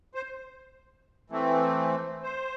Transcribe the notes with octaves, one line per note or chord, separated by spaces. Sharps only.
C5
E3 A3 C4
C5